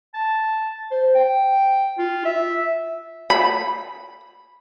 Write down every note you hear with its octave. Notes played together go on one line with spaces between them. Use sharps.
A5
C5
G5
F4
E5
B5